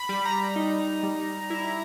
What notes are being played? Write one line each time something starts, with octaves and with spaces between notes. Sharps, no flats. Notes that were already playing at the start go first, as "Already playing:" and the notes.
Already playing: B5
G3
A#5
D#4
G3
E4